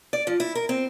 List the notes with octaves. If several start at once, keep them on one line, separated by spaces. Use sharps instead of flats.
D5
F3
E4
A#4
C4